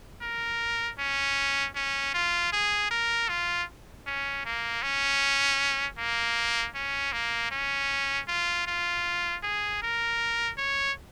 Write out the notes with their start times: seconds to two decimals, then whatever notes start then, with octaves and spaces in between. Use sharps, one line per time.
0.22 A#4
0.99 C#4
1.76 C#4
2.14 F4
2.53 G#4
2.91 A#4
3.29 F4
4.07 C#4
4.45 A#3
4.83 C#4
5.98 A#3
6.75 C#4
7.13 A#3
7.52 C#4
8.28 F4
8.67 F4
9.43 G#4
9.82 A#4
10.58 C#5